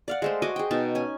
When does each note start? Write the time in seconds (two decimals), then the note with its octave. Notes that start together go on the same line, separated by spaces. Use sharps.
0.08 D5 F5 F#5
0.22 G#3 A3 C5
0.42 F#4 D#5 G#5 D6
0.56 G#4 G5
0.71 B2 D#4 A5
0.95 C#4 G#5